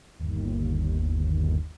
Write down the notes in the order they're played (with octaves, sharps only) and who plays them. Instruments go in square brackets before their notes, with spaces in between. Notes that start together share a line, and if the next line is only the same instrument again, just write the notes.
[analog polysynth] G1 D#2